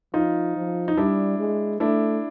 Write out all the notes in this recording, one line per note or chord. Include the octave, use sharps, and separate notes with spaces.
F3 D#4 F4
F3
D#4
G3 D4 E4
G#3
A3 D4 E4